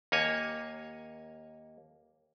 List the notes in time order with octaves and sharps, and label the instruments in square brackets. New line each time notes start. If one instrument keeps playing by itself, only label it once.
[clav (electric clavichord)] D#2 A#3 C#5 G#5